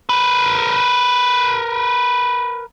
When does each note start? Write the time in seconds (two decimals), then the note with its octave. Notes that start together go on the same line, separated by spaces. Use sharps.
0.09 A#4 B4